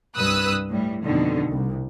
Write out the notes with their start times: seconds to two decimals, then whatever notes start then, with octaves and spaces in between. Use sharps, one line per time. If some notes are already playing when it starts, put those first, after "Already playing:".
0.16 C2 G2 B4 D#6 E6 F#6
0.69 A2 G3
1.03 F2 B2 D3 D#3
1.48 C2